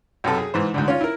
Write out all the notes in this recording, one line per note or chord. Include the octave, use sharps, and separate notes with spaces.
B1 F#2 C3 A4
G#4
G#2 E3 C5
D2 G#2 D3
C#4 F4
E4 A#4